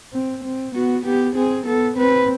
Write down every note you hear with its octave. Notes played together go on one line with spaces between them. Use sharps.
C4
C4
B3 F#4
B3 G4
C4 G#4
B3 A4
C4 B4